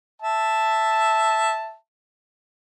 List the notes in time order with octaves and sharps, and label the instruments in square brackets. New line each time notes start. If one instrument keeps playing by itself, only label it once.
[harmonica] E5 A5